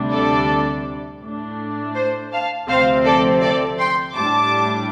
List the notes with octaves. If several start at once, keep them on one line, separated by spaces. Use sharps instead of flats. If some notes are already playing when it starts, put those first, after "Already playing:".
Already playing: D2 C3 G3 D4
A4 D5
A2 A3 D4
C5
F5 A5
D2 C3 F3 C4 C5 F5
A4 D5
A4 D5
G5 C6
A2 G3 D4 A5 D6